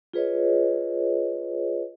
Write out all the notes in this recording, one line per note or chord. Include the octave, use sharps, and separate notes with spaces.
F4 G#4 B4 C#5 D#5